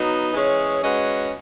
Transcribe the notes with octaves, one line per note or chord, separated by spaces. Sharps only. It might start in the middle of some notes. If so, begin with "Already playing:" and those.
Already playing: F#3 B3 D#4
E3 G#3 C#4 G#4 C#5
G#3 C#4 F#4 B4 D#5